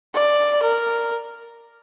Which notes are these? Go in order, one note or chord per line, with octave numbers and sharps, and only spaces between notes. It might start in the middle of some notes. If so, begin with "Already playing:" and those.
D5
A#4